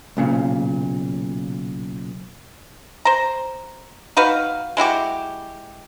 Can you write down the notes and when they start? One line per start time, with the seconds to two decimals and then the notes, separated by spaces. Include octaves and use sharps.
0.17 B1 A#2 C#3
3.05 C5 A#5
4.17 D#4 F#4 B4 F5
4.77 G#3 E4 F#4 G4